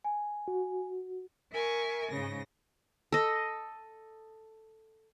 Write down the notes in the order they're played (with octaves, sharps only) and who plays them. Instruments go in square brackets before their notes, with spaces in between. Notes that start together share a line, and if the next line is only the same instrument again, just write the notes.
[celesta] G#5
[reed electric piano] F#4
[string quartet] A#4 E5 G#5 C#6
G#2 C#3 A#6
[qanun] A4 D#5